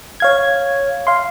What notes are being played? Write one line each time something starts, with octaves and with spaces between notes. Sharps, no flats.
C#5 F5 G#6
F5 C6